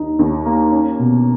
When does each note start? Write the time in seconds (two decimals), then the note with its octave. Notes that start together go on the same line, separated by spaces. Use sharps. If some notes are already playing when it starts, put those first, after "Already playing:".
Already playing: D#2 D#4
0.19 D#2
0.46 A#3
0.72 C#4
0.99 B2